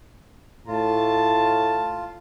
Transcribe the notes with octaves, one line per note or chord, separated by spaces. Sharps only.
A2 F4 A5